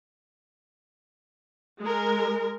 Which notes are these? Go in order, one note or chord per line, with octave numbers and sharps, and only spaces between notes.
G#3 A#4